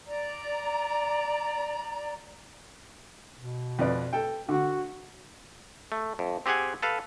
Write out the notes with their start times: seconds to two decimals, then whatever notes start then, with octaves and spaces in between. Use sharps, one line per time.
0.07 D5 A#5
3.36 B2
3.79 F2 B4 D5
4.13 A4 G5
4.49 D3 F#4
5.92 A3
6.19 F2
6.46 C4 G4 G#4 F#5 G#5
6.83 A4 B4 F5